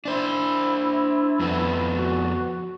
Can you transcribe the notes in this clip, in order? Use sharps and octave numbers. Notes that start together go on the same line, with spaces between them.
D4 E4 C5
F2 B3
F#4